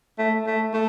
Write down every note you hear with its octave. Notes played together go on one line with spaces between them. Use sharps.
A3
A3
A3